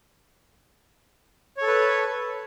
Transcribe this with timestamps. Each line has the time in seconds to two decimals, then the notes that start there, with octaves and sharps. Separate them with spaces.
1.57 C#5
1.62 A4
1.67 B4